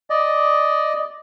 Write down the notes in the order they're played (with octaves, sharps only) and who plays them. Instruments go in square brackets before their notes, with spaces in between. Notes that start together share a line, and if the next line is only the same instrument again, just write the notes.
[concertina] D5 D#5